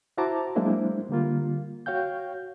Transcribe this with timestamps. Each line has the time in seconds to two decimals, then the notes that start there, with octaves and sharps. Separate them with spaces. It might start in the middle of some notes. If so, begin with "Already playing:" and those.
0.18 E4 F#4 C5 A5 A#5 D6
0.56 F#3 G#3 A#3 D4 E4 C5
1.09 D3 G3 A#3 F4
1.86 F#4 C#5 F5 G5 G6